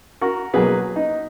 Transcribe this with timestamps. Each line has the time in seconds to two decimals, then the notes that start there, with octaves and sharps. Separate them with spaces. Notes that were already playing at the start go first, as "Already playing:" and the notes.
0.21 F#4 A#4
0.54 B2 F#3 A#3 G#4 B4
0.96 D#4